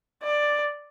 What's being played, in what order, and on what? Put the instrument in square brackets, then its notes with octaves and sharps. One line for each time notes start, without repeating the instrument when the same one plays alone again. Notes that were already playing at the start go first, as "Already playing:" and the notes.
[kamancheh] D5